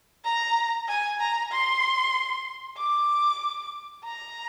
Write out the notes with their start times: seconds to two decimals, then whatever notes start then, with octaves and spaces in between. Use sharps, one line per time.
0.25 A#5
0.88 G#5
1.20 A#5
1.52 C6
2.77 D6
4.04 A#5